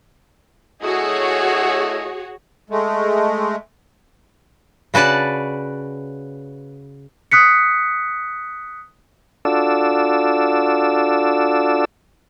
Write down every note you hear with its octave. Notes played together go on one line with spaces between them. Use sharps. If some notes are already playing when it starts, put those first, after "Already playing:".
A3 E4 F#4 G#4 C#5 D#5
G#3 A3
C#3 F#4 B4 D5 A5
D#6 F#6 B6 C#7
D4 F4 F#4 A4 D5 E6